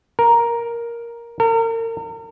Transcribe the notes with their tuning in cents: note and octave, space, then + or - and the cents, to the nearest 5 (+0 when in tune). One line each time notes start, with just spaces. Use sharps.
A#4 +5
A#4 -40